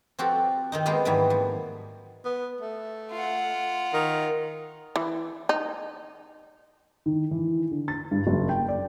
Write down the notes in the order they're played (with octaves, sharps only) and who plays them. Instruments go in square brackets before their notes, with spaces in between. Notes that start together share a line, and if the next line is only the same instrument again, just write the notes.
[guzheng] F3 C4 F#4 G4 A4
D#3 C4 D#4
G#3 A#3 B3 F4 G4
G#2 D#3 E3 F#3 G3
F3
[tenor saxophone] B3
A3
[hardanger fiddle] F4 F#5
[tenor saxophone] D#3
[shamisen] E3
D#4
[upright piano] D#3
E3
D3
A6
G2
F#1
G5
D5